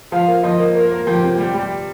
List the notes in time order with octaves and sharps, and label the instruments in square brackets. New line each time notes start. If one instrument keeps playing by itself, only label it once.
[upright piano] F3 [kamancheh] F5
[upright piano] A#3
[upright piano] F3 [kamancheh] D#5
[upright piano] A#3
[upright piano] A#3 [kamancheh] A#4
[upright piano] A#3
[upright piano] F3 [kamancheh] G4
[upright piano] C3
[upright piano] G3 [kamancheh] G4
[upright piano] G3